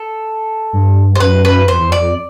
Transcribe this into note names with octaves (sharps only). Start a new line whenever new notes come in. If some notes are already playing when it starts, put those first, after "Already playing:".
Already playing: A4
G2
C5
F#2 B4
B4
F2 C5
E2
F2 D5